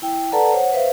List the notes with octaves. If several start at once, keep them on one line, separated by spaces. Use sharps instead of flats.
E4 G5
A4 B4 D5 F#5 A5 A#5
C5 C#5 F#5
B4 C5 E5 F5